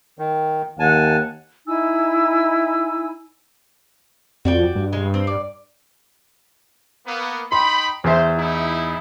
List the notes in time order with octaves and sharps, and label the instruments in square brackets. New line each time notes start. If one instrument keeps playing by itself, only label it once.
[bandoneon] D#3
[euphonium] D#2 [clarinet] F#5 [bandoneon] G#5 A5
[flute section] D#4 E4 G#5 E6
[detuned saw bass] F2 [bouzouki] F#4 D5 G5
[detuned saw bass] G2
[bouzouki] C#3 G#3
C4
D5
[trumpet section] A#3 B3
[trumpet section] D#4 G5 B5 [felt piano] C6
[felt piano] E2 E5 [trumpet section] C5
[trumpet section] D#4 E4